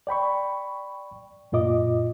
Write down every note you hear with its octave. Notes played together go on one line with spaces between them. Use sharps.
D5 G5 B5 C#6
F#2 A#2 F4 D#5 D6